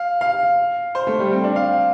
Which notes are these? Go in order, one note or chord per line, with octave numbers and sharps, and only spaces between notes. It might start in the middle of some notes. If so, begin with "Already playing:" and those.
Already playing: F5
F5
C5
A3
G3
C4
D4
F5